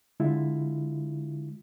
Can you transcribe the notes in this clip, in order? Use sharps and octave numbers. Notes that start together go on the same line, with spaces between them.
D3 G#3 E4 F4